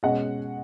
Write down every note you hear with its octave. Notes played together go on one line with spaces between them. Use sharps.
B2 G#3 C#4 D#5 F#5